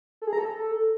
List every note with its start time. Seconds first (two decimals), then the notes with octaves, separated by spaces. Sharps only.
0.22 A4
0.27 G#4
0.33 A#5
0.38 A4